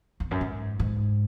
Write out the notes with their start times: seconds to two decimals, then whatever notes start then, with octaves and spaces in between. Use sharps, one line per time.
0.20 E2
0.31 F#2
0.41 G#2
0.79 G#2